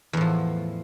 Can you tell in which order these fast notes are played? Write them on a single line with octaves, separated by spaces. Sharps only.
E2 A2 F3